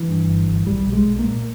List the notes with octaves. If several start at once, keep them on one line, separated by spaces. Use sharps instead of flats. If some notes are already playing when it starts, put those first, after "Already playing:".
Already playing: E3
G2
G1
G1
B1 G3
B1
G#3
B1
A#3
A#2